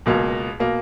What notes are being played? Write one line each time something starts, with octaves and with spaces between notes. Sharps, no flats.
C#2 B2 A#3
B2 A#3